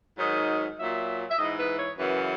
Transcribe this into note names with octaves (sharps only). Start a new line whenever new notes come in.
G#2 D#3 F#3 D#5
A#2 F#3 E5
E5
G#2 E3 D#5
B4
C#5
F#2 C#3 E3 B4